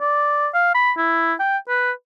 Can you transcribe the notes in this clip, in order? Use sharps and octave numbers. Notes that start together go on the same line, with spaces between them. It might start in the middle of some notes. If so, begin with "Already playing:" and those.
D5
F5
B5
E4
G5
B4